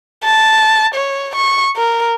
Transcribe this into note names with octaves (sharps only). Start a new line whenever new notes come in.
A5
C#5
C#6
A#4